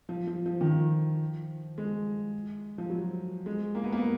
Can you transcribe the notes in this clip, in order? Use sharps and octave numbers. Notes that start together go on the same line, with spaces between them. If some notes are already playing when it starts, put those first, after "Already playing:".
F3
F3
F3
D#3
F3
G#3
F3
F#3
G#3
A#3
B3
A#3
B3